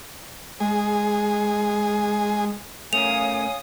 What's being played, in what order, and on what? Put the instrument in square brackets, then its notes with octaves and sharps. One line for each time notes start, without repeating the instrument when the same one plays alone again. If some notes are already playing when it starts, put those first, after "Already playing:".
[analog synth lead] G#3 [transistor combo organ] G#4
[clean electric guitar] A3 C#4 A#4 [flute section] C#5 F5 G#5 [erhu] D#6 [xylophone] F7